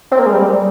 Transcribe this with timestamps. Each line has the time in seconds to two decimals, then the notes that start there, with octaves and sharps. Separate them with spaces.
0.11 C4
0.19 A#3
0.26 G#3
0.33 G3